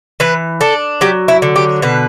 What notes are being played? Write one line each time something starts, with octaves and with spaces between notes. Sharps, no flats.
E3 B4
D4 A4
F#3 G4
E4
D3
G4
B2 B4